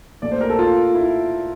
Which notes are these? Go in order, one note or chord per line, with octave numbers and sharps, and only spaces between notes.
A#2 A3 D5
C5
A#4
A4
F4
E4